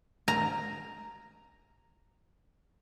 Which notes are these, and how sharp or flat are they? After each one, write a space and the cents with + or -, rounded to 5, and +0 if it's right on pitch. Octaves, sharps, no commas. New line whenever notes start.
A#5 +0